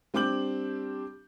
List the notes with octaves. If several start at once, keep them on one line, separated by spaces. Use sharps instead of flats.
G3 C4 D4 D6 G6 F#7